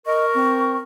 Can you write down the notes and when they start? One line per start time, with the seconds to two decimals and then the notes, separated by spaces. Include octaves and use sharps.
0.06 A#4 D#5 C#6
0.35 C4